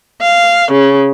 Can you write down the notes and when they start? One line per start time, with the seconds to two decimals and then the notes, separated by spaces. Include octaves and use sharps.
0.20 F5
0.71 C#3